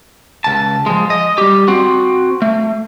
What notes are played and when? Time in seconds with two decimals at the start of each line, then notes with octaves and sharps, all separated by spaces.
0.44 C#2 A5
0.86 F3 G#3
1.10 D#5
1.38 G3 G4
1.68 C4 F#4
2.42 A3